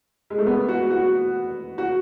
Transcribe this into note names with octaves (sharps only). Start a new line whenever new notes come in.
G#3
A3
B3
F#4
F#4
F#4